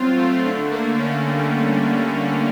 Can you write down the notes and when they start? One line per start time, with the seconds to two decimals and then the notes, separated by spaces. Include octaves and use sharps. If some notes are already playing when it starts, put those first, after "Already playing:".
Already playing: F#3 C4 F4
0.18 A3
0.46 D3
0.72 A#3
1.00 C#4
1.28 G3